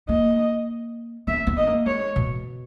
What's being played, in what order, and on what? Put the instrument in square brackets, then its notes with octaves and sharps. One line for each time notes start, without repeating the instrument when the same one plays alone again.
[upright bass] A#3 [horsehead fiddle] D#5
[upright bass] B3 [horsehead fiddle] E5
[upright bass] B3
[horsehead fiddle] D#5
[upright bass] A#3
[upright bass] G#3 [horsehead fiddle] C#5
[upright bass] B2